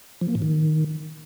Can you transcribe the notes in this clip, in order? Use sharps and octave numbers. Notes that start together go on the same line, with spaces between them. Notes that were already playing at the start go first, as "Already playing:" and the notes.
F3
A#3
A2
D#3